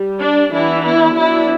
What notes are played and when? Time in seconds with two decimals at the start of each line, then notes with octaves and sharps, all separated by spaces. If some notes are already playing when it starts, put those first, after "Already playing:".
Already playing: G3
0.20 D4
0.52 E3 B3 D4 E4
0.84 E4
1.15 F#3 B3 D4 E4